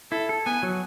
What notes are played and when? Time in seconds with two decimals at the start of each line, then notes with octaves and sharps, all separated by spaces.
0.11 E4 A4
0.29 A4
0.46 B3 G#5
0.63 F#3